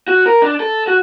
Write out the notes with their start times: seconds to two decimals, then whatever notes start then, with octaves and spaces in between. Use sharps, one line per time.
0.08 F#4
0.26 A#4
0.42 D4
0.60 A4
0.87 F#4